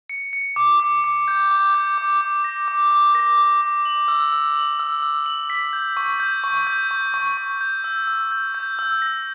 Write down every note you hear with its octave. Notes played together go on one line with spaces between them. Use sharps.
C#7
C#7
D6
D6
D6
G6
D6
G6
D6
D6
A#6
D6
D6
A#6
D6
D6
F#7
E6
E6
F#7
E6
E6
F#7
B6
G6
C#6
G6
C#6
G6
C#6
C#6
C#6
G6
E6
E6
G6
G6
E6
A#6